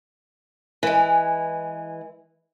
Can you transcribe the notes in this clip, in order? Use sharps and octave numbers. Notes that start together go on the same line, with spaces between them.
E3 G#3